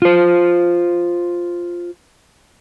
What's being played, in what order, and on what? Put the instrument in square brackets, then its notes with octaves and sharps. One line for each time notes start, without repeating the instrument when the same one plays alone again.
[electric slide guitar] F4 C5